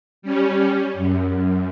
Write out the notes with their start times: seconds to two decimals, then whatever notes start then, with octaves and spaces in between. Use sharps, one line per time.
0.22 G3 C#4
0.93 F#2